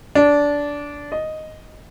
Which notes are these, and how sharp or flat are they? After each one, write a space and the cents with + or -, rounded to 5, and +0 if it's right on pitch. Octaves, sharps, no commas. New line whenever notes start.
D4 -15
D#5 +0